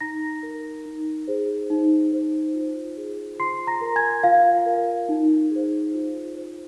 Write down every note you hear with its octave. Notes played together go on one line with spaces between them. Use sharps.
D#4 A#5 A#6
A#4
D#4
G#4 C5
D#4
C5
F4
G#4 C5
F4 C6 C7
A#5 A#6
A#4
G#5 G#6
F4 F5
A#4
D#4
G#4 C5
F4
C5